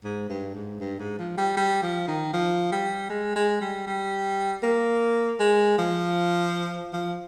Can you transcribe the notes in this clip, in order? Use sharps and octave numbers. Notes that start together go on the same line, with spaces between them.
G#2
G2
G#2
G2
G#2
F3
G3
G3
F3
D#3
F3
G3
G#3
G#3
G3
G3
A#3
G#3
F3
F3